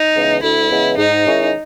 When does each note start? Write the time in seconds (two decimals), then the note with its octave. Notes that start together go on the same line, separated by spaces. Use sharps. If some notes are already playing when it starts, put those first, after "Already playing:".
Already playing: D#4
0.16 C#3 E3 G#3 B3
0.43 D2 E4
0.70 C#3 E3 G#3 B3
0.98 G#2 D#4
1.25 D#3 G#3 C#4 E4